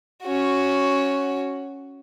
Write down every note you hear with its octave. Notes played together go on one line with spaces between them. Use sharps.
C#4 F#4